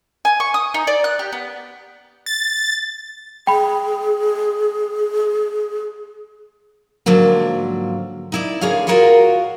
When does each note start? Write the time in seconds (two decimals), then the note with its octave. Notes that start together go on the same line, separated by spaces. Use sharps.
0.25 G#5
0.40 C#6
0.54 D#6
0.74 D#4
0.87 D5
1.04 F#6
1.19 G4
1.33 B3
2.26 A6
3.47 G#4 G5 B5
7.06 G#2 D3 F3 F#3 A#3
8.32 D#4 E4 D5
8.61 D3 A#3 G#4 C#5 F5
8.87 F4 F#4 A#4 C#5 D#5 F5